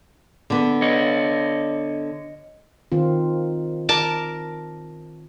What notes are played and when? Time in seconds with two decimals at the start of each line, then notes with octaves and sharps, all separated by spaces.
0.50 D3 B3
0.82 C#5 D#5
2.92 D#3 C4 F4
3.89 A#4 A5 D6